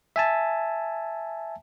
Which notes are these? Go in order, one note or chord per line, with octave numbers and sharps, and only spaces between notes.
E5 G#5 A5